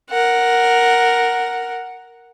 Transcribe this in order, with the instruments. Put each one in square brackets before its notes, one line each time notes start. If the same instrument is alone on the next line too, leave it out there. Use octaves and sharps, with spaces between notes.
[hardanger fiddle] A#4 F#5